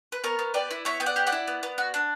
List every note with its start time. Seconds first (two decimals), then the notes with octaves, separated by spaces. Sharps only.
0.12 B4
0.24 B3 A#4 C#5
0.39 B3
0.54 G4 B4 D5
0.71 E4
0.85 B3 C#5 E5
1.00 B3 G5
1.06 D5 F#5
1.16 G4
1.27 D5 F#5
1.32 E4
1.48 B3
1.63 B3
1.78 F#4
1.94 D4